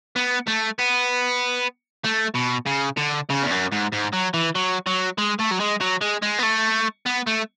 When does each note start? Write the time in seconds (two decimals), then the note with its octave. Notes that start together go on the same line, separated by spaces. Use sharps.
0.16 B3
0.47 A3
0.79 B3
2.05 A3
2.35 B2
2.67 C#3
2.98 D3
3.30 C#3
3.43 E2
3.51 F#2
3.72 G#2
3.92 G#2
4.13 F#3
4.34 E3
4.55 F#3
4.87 F#3
5.18 G#3
5.39 A3
5.51 F#3
5.60 G#3
5.81 F#3
6.01 G#3
6.22 G#3
6.38 B3
6.43 A3
7.06 B3
7.27 A3